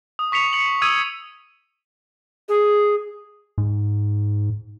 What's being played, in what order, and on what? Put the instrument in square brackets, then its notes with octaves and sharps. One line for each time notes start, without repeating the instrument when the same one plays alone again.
[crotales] D#6
C#6 B6 C#7 F7
C#7 F#7
D#6 E6 G#6 D#7
[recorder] G#4
[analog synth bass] G#2